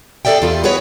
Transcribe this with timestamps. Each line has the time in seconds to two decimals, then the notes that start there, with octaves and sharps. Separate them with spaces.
0.25 G#4 A4 B4 D5 E5 G5
0.42 E2 F4 G4
0.64 B3 F#4 G#4 B4 C#5